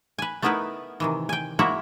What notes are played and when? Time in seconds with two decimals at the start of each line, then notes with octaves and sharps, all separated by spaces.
0.18 B4 G#5
0.42 A3 B3 D#4 E4 A#4 B4
1.00 C3 D#3 E3
1.29 G5 G#5
1.59 G#3 A#3 E4 F#4 C#5 E5